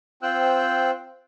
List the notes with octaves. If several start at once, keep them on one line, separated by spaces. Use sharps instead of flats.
C4 F4 C5 G5 E6 F#6